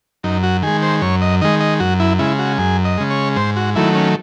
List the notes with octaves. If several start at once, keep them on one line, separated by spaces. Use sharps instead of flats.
F#2 D#4
F#4
D#3 G#3 G#4
C5
F#2 C#5
D#5
D#3 G#3 D#5
D#5
F#2 F#4
E4
C#3 G#3 E4
F#4
F#2 G#4
D#5
C#3 G#3
C#5
G#2 C5
F#4
D#3 F#3 A3 E4
C#4